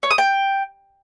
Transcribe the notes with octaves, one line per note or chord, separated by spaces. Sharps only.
C#5
D#6
G5